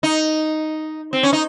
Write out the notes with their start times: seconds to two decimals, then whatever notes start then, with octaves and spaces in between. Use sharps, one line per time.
0.03 D#4
1.13 C4
1.23 C#4
1.33 D#4